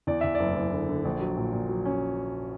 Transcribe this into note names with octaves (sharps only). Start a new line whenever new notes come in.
E2 D5
E2 E5
F#1 D5
F#1
D3
D3
A#1
F#3
A#2
A#2
F#3
C#4